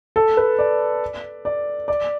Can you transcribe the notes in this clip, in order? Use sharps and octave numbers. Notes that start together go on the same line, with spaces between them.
A4
B4
D5
D5
D5